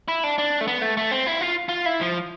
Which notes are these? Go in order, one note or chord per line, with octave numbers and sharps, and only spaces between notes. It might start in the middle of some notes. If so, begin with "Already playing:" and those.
E4
D4
D4
A3
B3
A3
A3
C4
E4
F4
F4
E4
F3